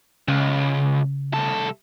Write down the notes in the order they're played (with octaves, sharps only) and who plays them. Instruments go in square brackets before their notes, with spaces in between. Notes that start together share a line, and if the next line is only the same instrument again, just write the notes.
[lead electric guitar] C#2 [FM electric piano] C#3
[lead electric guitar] C2 A4